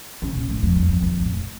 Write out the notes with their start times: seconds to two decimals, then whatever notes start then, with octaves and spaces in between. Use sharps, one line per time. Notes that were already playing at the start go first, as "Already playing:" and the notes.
0.22 C#3
0.36 A#2
0.49 A2
0.62 F2
0.76 G2
0.88 F2
1.02 E2
1.11 F2
1.21 A2